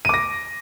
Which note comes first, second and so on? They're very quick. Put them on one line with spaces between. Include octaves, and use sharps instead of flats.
D#7 D6 A#6